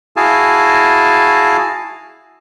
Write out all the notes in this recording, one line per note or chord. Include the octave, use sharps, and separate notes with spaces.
E4 F#4 G#4 F5 G#5 A5